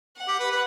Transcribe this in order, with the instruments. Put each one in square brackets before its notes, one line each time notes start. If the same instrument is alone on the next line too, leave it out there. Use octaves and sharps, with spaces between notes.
[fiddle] F#5
[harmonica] G4
B4
B4